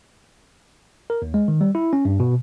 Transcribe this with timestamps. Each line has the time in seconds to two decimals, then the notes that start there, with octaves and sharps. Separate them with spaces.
1.10 A#4
1.22 D#2
1.34 G#3
1.48 D#3
1.61 G3
1.75 E4
1.93 C#4
2.05 G2
2.20 B2